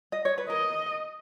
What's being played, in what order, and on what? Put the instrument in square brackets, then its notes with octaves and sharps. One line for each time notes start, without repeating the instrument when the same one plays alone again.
[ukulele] D#5
C#5
B4
[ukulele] A#4 [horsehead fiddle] D#5